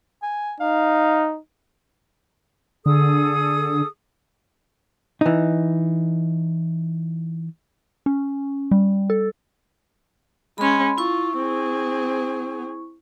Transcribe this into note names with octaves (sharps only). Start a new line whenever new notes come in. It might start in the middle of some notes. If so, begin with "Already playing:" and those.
G#5
D#4 F5
D3 G#4 A4 D#6
E3 D#4
C#4
G3
A4
G#3 C#4 B5 C6
E4 F4 C#6
C4 G#4